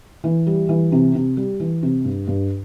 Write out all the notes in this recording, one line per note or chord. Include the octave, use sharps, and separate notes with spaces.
E3
G3
E3
C3
C3
G3
E3
C3
G2
G2